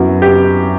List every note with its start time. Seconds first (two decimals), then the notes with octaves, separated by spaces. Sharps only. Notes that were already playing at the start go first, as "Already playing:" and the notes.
Already playing: F#2 F#3 B3 E4 F#4
0.22 G4